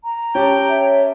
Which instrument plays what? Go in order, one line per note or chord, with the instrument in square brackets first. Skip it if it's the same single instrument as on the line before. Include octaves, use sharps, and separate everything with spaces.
[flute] A#5
[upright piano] C#4 G4 A5 [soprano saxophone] G5
[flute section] C#5 E5